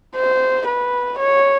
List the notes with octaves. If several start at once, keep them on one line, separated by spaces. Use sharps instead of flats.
C5
B4
C#5